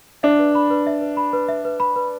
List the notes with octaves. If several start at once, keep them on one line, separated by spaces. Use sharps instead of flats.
D4 E5
B4
B5
B4
E5
B4
B5
B4
E5
B4
B5
B4